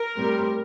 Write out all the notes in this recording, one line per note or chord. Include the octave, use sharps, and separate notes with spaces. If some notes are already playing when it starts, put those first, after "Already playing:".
Already playing: A#4
A2 G3 C4